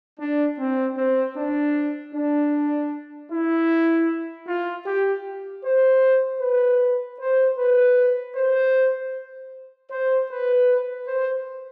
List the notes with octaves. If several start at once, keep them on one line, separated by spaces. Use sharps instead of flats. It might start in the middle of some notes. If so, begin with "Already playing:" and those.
D4
C4
C4
D4
D4
E4
F4
G4
C5
B4
C5
B4
C5
C5
B4
C5